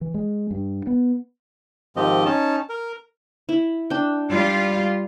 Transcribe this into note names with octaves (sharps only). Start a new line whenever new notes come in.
E3
G#3
G2
B3
G#2 D#3 F3 C4 G4 D#5
C#4 D#4 A5
A#4
E4
D4 G5
G3 F4